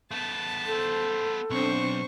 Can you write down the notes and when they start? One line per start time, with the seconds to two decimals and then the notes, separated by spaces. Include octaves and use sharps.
0.11 A3 B3 A5
0.67 A4 C5
1.50 B1 C4 D4 C5 C#6